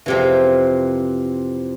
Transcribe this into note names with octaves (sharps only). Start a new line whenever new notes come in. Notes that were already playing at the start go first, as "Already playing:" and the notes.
F2 C3 E3